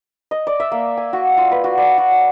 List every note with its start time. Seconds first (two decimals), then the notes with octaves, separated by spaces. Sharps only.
0.31 D#5
0.47 D5
0.60 E5
0.72 A#3
0.97 G#5
1.13 F#4
1.37 F4
1.51 B4
1.64 F#4
1.78 D5
1.98 F#4
2.12 F#3